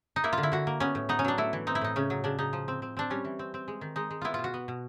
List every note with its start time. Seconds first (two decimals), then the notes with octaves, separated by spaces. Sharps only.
0.16 D#4
0.24 A#3 E4
0.33 D3 F4
0.43 E4
0.52 D3 F#4
0.67 A#3
0.80 B3 C#4
0.95 A2
1.09 B3 D#4
1.19 C#4
1.25 F#3 D4
1.38 A3 E4
1.53 E3
1.67 C4 D#4
1.75 E4
1.81 A2 D#4
1.96 C#3 C#4
2.10 F#3
2.24 C#3 D4
2.39 C#3 D#4
2.53 F3
2.68 C4
2.82 C4
2.97 C4 D4
3.10 G3 C#4
3.25 E3
3.39 C4
3.54 C4
3.68 G#3
3.81 D#3
3.96 G#3 D#4
4.11 G#3
4.22 B3 E4 F4
4.34 B2 F4
4.44 F#4
4.54 B3
4.68 B2